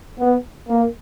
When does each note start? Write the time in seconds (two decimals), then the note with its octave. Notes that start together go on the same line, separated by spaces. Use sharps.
0.19 B3
0.68 A#3